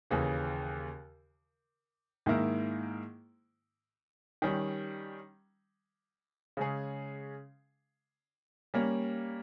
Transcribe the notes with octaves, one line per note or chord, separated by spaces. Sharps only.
D#2 C#3 E3
G#2 D#3 A#3 E4
D#3 G3 C#4
C#3 G#3 C#4 G#4
G3 A#3 C#4